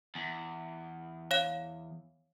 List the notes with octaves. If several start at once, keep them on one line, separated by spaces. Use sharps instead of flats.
E2
C#5 F5 E7